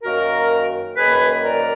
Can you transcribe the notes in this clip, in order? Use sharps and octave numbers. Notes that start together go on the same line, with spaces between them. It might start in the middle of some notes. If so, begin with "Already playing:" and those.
F#2 D#3 A#3 F#4 A#4
F#2 D#3 A#3 G#4 B4
A#4 D5